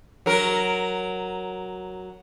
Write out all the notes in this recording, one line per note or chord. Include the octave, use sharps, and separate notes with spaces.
F#3 A#4